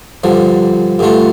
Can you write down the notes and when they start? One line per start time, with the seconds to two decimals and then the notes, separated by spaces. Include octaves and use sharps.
0.24 G2 D3 F3
0.99 G2 D3 A3 F4